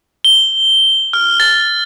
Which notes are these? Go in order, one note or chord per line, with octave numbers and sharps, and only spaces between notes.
G7
F6
A6